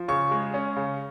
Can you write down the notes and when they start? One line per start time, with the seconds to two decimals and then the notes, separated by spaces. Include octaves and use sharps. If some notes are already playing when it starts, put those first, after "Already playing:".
Already playing: F3
0.08 C#3 C#6
0.31 G#3
0.54 C#4
0.76 C#3